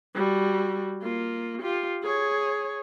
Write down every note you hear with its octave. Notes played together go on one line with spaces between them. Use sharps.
G3 F#4
A#3 F4
F4 G4
G#4 C#5